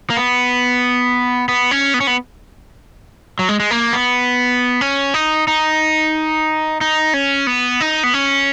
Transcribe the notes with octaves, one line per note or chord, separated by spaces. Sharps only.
A#3
B3
B3
C#4
B3
C#4
B3
F#3
G#3
G#3
A#3
B3
C#4
D#4
D#4
D#4
C#4
B3
D#4
B3
C#4